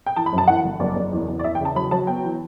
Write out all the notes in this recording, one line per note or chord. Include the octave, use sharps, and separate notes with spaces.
G5
E3 A5
B5
F#2
A5
E3 F#5
G1
F#1 D5
F#1
E2
E2
D5
E2 E5
G5
C#3 A5
F#3 B5
F#3 A5
B3 G5
E3